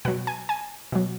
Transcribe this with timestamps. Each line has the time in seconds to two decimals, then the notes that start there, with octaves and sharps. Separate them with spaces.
0.05 B2 F#3 F#5
0.27 G#5
0.49 G#5
0.92 B2 F#3